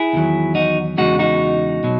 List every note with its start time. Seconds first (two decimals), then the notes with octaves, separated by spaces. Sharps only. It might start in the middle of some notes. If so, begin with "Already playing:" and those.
Already playing: E4 G#4
0.13 E2 D#3 F#3
0.55 D#4 F#4
0.98 E2 C#3 G#3 D#4 F#4
1.19 D#4 F#4
1.84 B2 F#3